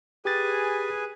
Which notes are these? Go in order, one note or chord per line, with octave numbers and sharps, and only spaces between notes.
G4 G#4 B4 G#5 A6